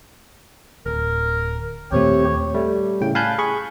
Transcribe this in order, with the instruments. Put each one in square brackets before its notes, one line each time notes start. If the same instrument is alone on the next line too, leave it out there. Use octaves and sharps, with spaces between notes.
[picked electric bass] D1 [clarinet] A#4
[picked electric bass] D#2 A#2 A3 [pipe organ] C4 G4 C5 [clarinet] C#5
[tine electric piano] G3 A3
A2 C#3 G5
F5 G#5 A5 B5 F#6 G6
G#4 B5 C#6